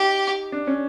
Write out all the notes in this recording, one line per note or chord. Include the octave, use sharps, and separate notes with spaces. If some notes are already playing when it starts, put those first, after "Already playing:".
Already playing: D#4 G4
D4
C#4